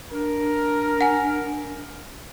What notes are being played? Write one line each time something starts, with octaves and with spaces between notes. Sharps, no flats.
D4 A#4
F#5 G#5